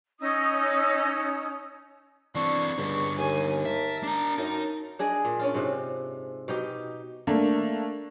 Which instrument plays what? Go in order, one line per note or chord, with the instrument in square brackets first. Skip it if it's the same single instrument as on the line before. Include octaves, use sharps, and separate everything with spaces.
[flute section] C#4 D#4 D#6 E6
[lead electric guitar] E3 C4 [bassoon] D4 [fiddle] C#6
[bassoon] C#2 [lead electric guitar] G2 D3
[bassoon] D#2 [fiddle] G#5
[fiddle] A#4 A5 [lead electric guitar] E5
[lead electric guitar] D4 A#5
[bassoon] F#2 [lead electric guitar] D#4
[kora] D4 G#4 D#5
A#2
C#4 D4 F4
G#2 C3
B2 D#4 G4
[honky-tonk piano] A3 A#3 D4